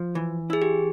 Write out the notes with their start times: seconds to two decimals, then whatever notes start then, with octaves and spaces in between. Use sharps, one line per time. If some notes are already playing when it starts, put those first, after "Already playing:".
Already playing: F3
0.15 E3
0.50 E4 G#4
0.62 G4